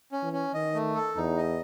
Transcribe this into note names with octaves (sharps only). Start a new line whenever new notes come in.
C#4
E3
C#4
D#3 D#5
A3
A4
E2 D#4
D#5